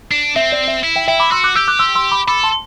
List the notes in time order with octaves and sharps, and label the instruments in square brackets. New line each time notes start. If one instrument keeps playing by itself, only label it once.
[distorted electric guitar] D4
[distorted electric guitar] C4 [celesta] E5
[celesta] D5
E5
[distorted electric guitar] E4
[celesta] E5 G5
[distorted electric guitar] E4 [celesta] E5 G5
[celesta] B5 D6
[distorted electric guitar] F#4 [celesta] C6 E6
[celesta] D6 F#6
[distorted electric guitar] G4 [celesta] E6 G6
[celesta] D6 F#6
C6 E6
C6 E6
B5 D6
[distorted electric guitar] A4 [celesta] B5 D6
[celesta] A5 C6